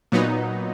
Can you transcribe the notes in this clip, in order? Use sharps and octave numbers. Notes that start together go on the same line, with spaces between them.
A#2 F#3 B3 D#4